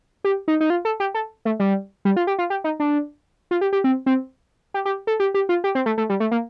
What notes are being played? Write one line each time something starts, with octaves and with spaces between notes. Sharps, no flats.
G4
D#4
D#4
F4
A4
G4
A4
A3
G3
G3
F4
G4
F4
G4
D#4
D4
F4
G4
G4
C4
C4
G4
G4
A4
G4
G4
F4
G4
C4
A3
A3
G3
A3
A#3